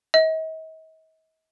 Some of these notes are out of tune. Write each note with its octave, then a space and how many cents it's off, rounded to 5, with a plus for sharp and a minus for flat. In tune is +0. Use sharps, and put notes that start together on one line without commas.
D#5 +45